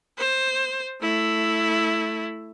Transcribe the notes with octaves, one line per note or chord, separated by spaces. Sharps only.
C5
A3 E4